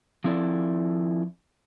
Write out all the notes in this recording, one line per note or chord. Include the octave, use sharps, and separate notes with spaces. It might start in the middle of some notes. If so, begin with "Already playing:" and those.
F3 C4 E4 A4 D5